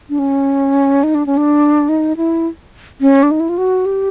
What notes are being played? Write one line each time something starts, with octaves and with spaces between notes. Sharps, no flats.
D4
C#4
D#4
D4
C#4
D4
D#4
E4
C#4
D4
D#4
E4
F4
F#4
G4